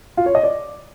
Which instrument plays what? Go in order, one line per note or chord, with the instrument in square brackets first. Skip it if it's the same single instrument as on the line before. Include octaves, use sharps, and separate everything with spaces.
[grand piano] F4
C#5
D#5
D5